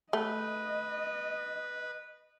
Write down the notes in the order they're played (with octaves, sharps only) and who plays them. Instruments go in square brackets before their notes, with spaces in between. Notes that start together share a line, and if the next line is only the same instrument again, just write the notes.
[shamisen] A3 [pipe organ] B4 [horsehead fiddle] D#5